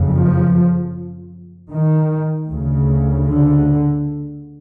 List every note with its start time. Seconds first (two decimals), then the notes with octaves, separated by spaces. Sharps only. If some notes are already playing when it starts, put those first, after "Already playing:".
Already playing: F#1 F2 C#3
0.11 F3
1.70 D#3
2.49 D2 C#3
3.28 D3